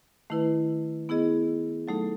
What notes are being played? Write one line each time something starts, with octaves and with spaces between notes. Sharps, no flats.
D#3 A3 E4 B4
B3 E4 G#4 D#5
F#3 A3 D#4 A4